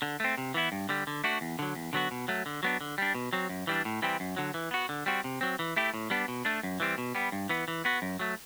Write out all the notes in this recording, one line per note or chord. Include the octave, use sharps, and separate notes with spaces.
D3
A3 C4
C3
E3 B3 E4
G2
D3 G3
D3
A3 D4 F#4
E2
D3 F#3
E2
D3 F#3 B3 F#4
B2
F#3 A3
D3
F#3 B3 D4
D3
G3 D4
B2
F#3 C4
F#2
E3 G3 D4
A2
E3 G3 C4
F#2
D3 F#3
E3
B3 F#4
D3
G3 C4 F#4
C3
F#3 C4
E3
A3 E4 G4
A2
G3 B3 D4
B2
A3 D4
F#2
E3 G3 C4
B2
G3 B3
G2
E3 B3
E3
B3 F#4
F#2
F#3 A3